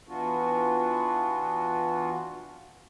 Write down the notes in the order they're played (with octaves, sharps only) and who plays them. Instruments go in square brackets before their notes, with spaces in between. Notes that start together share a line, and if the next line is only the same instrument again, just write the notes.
[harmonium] E3 B3 D4 F4 F#4